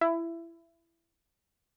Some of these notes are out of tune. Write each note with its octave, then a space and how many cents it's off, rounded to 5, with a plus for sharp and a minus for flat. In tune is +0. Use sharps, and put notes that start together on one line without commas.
E4 +20